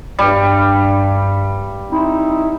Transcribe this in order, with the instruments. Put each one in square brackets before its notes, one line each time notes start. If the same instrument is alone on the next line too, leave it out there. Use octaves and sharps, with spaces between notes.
[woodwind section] G2 [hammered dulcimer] G3
[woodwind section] C4 D#4 E4